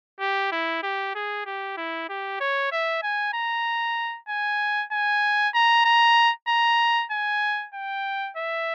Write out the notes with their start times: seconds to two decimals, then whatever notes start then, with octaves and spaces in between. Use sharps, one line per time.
0.20 G4
0.52 E4
0.83 G4
1.15 G#4
1.46 G4
1.77 E4
2.09 G4
2.41 C#5
2.72 E5
3.03 G#5
3.34 A#5
4.29 G#5
4.92 G#5
5.54 A#5
5.85 A#5
6.49 A#5
7.11 G#5
7.75 G5
8.37 E5